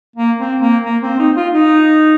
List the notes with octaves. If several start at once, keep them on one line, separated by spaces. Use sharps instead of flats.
A#3
C4
A#3
A#3
C4
D#4
F4
D#4